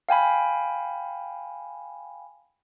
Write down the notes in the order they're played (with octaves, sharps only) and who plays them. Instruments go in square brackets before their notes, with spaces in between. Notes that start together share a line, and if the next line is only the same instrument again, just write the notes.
[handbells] F5 G5 G#5 B5